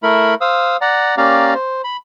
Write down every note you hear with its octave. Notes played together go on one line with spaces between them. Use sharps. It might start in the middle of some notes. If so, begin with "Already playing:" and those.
A3 E4 A#4 B5
C5 F5 D#6 E6
D5 F#5 A#5
A#3 C#4 G4 D5 F5 A#5
C5
B5